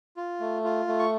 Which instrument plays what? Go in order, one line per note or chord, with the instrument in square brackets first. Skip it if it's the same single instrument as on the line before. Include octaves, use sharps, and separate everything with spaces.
[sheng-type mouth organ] F4
A3
F4
A3
C#6